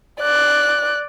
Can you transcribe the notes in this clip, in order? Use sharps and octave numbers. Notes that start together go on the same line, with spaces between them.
D5 F#6